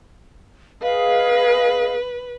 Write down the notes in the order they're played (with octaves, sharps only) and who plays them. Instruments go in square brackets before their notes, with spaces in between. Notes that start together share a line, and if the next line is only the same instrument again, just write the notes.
[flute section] G#4 D#5 F5 [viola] B4